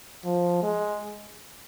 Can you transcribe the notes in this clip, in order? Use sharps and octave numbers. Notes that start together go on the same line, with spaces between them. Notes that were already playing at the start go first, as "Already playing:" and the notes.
F3
G#3